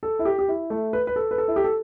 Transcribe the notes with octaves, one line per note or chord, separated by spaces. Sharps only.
A4
E4
G4
G4
E4
A3
B4
B4
A4
B4
A4
E4
G4
A4